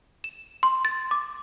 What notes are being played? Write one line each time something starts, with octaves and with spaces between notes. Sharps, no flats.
E7
C6
A6
D6